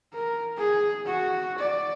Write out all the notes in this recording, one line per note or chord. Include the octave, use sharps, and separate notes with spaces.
A#4
G#4
F#4
D5